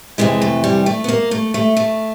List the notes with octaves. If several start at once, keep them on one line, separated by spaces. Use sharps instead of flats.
F2 C3 E3 G#3
A3
G3
A3
B3
A#3
A3
A3
A3